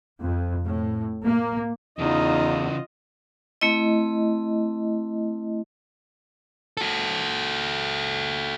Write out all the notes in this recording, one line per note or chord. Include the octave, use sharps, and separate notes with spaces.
F2
A2
A#3
E2 C#3 E3 D#4 F4 D#5
A3 C4 E4 D#5
F#4 A4